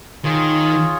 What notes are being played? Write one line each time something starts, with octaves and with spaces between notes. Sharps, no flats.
D#3 F4 G#4 C#5